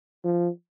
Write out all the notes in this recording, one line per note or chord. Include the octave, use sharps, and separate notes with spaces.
F3